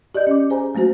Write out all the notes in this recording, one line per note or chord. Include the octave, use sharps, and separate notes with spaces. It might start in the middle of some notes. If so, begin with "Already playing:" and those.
G4 D5 D#5 G6
C#4 D6
G#4 C5 G#5 A#5
F#3 A3 A#3 F#4 C5